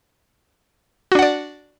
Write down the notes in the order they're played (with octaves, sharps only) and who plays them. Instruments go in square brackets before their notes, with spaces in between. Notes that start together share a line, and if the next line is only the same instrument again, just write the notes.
[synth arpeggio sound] F#4
D4
F#5
D5